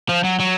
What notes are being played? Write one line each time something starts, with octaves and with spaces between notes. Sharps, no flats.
F3
F#3
F#3